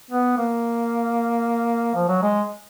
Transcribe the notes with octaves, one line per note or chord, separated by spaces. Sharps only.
B3
A#3
F3
F#3
G#3